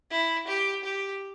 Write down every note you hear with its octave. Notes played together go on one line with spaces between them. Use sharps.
E4
G4
G4